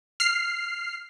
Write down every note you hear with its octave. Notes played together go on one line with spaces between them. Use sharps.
F6 C7